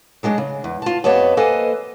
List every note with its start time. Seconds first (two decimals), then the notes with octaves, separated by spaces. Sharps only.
0.23 F#3 G#3 D4 D#5
0.38 C#3
0.64 E2
0.82 F4 A5
1.04 F2 B3 G4 C#5 D#5 A5
1.37 A#3 A4 B4 C5 D#5 G#5